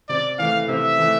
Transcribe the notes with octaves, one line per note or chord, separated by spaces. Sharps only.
C3 D5
E3 A3 F5
C3 E5
E3 A3